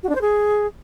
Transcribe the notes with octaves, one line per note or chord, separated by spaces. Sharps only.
F#4
D4
C5
G#4